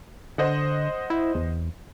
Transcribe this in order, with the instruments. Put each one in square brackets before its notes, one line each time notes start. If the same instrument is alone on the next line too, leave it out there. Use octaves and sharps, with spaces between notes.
[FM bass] D3 [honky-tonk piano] C5 D#5 F#5
[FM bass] E4
E2